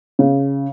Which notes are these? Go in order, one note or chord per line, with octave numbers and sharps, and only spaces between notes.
C#3